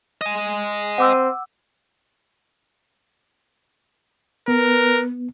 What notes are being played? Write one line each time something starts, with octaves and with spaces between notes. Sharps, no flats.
D#5 G#5
C4 F#5 D6 E6
B3 A#4 B4